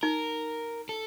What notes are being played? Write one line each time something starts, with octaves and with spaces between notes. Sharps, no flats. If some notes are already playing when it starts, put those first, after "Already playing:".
D#4 A#4
A4